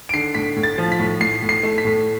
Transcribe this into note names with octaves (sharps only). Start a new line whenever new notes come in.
D7
D3 C7
A2 B6
A2
A6
F3
B6
A2
A2 C7
A2
C7
A3
B6
A2